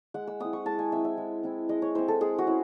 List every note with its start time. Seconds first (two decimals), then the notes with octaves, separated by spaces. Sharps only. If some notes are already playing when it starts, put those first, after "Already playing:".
0.14 G#3 F#5
0.27 E6
0.40 C4 E4 D#6
0.53 C#6
0.65 G#3 A5
0.79 G#5
0.92 C4 E4 E5
1.05 E5
1.18 G#3
1.43 C4 E4
1.69 G#3 D#5
1.82 C#5
1.95 C4 E4 C5
2.08 A4
2.21 G#3 G#4
2.38 F#4
2.47 C#4 E4